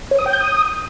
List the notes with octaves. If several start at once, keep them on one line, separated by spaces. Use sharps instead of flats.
C#5
D#6
G5
G6
D#6